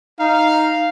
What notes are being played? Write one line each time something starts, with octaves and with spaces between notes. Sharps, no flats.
D#4 F5